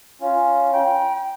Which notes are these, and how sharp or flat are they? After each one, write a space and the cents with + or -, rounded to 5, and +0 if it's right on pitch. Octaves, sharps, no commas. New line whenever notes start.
C#4 +0 F4 +0
G5 -5 A#5 +45